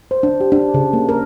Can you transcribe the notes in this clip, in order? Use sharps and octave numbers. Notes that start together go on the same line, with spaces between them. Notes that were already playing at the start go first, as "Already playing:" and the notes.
C5
D4
G4
D4
C#3
A#3
A#4